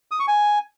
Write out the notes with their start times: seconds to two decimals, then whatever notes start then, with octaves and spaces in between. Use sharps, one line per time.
0.11 D#6
0.20 C#6
0.28 G#5